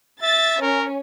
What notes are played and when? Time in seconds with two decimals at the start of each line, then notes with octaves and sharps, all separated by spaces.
0.23 E5 A6
0.62 C#4 A#4